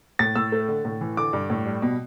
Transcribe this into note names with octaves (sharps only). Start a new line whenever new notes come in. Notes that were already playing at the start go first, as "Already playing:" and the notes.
A2 A6
A2 E6
A3
D3
A2
E3
D3 D6
G2
A2
G3
B2